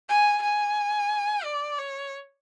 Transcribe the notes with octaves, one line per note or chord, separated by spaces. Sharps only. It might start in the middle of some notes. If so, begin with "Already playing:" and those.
G#5
G#5
D5
C#5